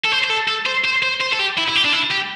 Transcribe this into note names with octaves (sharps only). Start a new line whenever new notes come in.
A4
C5
C5
A4
A4
C5
C5
C5
C5
A4
G4
E4
E4
G4
D4
E4
G4